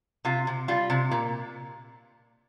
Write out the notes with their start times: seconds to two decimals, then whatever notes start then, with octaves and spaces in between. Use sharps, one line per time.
0.25 C3 F4
0.47 C3
0.68 G3 F4
0.90 C3
1.11 A#2